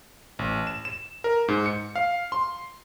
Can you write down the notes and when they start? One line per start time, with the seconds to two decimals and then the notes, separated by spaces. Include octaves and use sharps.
0.39 A1
0.67 E7
0.85 E7
1.24 A#4
1.48 G#2
1.66 C#7
1.96 F5
2.32 C6